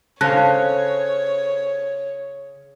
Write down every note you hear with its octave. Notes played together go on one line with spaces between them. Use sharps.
C#3 A4 C5 C#5 F5 A5 F#6 A#6